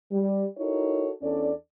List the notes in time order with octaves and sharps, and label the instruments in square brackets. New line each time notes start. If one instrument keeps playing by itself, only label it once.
[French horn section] G3
D#4 E4 F#4 A4 A#4 C#5
E2 C#4 D4 A4 D5